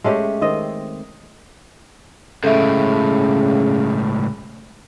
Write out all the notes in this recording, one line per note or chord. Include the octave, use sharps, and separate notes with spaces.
G#3 A3 C#4 G4
D#3 C4 D#5
C#2 A2 C#3 A4 E5